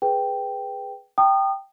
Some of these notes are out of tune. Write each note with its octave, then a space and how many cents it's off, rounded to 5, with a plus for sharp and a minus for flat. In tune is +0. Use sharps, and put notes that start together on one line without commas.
G#4 +0 B4 +0 G5 +0
G5 +0 A#5 -45 D#6 -30